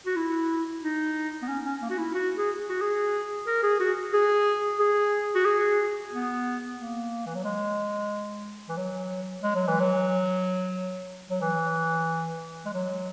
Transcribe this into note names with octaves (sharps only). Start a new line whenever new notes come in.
F#4
E4
D#4
B3
C#4
C#4
A#3
F#4
E4
F#4
G#4
F#4
G#4
A#4
G#4
F#4
G#4
G#4
F#4
G#4
B3
A#3
E3
F#3
G#3
E3
F#3
G#3
F#3
E3
F#3
F#3
E3
G#3
F#3